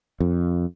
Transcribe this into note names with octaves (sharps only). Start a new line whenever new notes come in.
F2